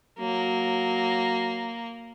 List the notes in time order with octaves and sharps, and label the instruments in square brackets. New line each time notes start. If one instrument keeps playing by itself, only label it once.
[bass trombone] F#3 [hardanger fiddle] A#3